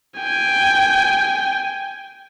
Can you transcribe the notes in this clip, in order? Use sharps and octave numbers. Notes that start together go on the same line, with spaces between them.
G5 G#5